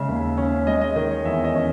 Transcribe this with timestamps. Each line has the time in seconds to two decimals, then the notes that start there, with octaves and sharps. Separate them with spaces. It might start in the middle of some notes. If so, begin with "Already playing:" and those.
Already playing: C#3 G#3 E5
0.09 D#2
0.37 C#4
0.67 G#3 D#5
0.81 D#5
0.96 D#3 D#5
1.11 C#5
1.25 E2 E5
1.44 D#5
1.55 C#4